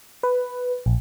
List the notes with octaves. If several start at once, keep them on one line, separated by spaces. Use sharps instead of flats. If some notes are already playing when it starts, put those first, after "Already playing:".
B4
A#1